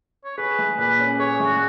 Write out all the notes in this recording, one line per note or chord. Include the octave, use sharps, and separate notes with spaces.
C#5
G#4 B4
G#3
A#2 B4
C#4
G#4 C#5
G#3
F#4